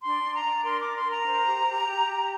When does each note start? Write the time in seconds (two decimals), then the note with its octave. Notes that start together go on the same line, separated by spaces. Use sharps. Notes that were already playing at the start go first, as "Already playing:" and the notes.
0.02 D4 C6
0.23 D4
0.34 A#5
0.44 D4
0.64 A#4 C6
0.80 D4 D6
0.95 C6
1.05 A#4 A#5
1.25 C5
1.46 G4
1.67 G4
1.87 G4
2.07 G4